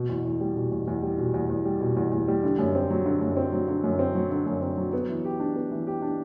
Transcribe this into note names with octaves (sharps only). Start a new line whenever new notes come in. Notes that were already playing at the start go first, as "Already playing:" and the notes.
Already playing: B2
E2
E2
G3
B2
E2
E2
G3
B2
E2
E2
G3
B2
E2
E2
G3
D3
F#2
C4
F#3
D3
F#2
C4
F#3
D3
F#2
C4
F#3
D3
F#2
C4
F#3
B3
E3
G4
D4
B3
E3
G4
D4